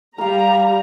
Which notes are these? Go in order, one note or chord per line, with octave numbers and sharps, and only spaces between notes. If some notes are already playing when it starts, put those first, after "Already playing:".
G3 A#4 F5 A#5